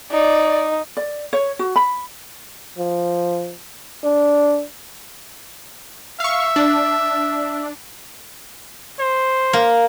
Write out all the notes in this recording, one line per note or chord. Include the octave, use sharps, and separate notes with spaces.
D#4 D5
D5
C#5
F#4
B5
F3
D4
E5 F5 C#6
D4
C5
A#3